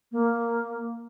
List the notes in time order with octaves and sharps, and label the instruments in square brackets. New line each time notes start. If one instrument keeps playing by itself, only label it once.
[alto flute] A#3